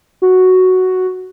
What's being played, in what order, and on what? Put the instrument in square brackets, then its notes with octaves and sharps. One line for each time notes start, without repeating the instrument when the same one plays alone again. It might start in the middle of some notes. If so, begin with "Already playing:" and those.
[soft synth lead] F#4